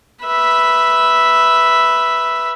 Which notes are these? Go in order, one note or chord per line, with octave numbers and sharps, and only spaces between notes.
B4 E5